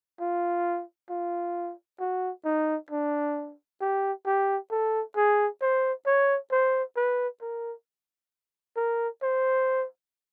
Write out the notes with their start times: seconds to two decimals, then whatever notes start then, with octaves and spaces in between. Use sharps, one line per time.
0.20 F4
1.10 F4
2.00 F#4
2.45 D#4
2.91 D4
3.81 G4
4.26 G4
4.71 A4
5.16 G#4
5.61 C5
6.06 C#5
6.51 C5
6.96 B4
7.41 A#4
8.76 A#4
9.23 C5